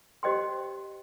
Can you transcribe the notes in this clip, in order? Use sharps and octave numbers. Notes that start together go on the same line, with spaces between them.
G4 C5 D#5 G5 C6